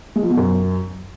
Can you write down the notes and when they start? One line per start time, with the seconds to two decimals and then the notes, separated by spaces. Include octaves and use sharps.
0.16 G#3
0.23 F3
0.30 B2
0.38 F#2